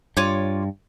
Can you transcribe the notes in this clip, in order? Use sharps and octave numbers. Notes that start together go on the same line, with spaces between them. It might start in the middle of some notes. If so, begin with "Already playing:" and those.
G2 F4 C#5 D6